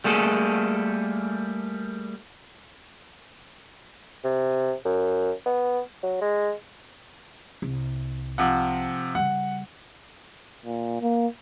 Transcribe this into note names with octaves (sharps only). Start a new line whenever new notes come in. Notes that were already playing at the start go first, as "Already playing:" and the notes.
G3 A3 A#3 G#4 A4
C3
F#2
B3
F#3
G#3
C2
C3 F3 F#5
C#3 G3 F#5
A#2
A#3